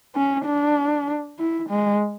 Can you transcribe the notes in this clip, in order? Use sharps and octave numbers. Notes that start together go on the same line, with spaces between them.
C#4
D4
E4
G#3